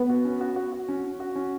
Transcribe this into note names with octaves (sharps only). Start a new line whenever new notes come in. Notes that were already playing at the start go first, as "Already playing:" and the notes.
Already playing: B3 B4
F#4
C#4
F#4
F#4
F#4
C#4
C#4
F#4
C#4